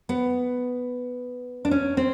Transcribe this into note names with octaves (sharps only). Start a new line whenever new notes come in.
B3
D4
C#4
C4